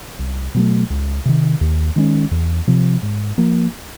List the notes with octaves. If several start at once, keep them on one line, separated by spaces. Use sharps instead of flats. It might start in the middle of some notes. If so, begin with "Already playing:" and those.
C2
B2 F#3 A3
C#2
C3 D#3
D#2
D#3 G#3 C#4
E2
C3 F3
G#2
F3 A#3